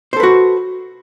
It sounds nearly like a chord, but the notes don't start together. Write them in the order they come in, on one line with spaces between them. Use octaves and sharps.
C5 A4 B4 F#4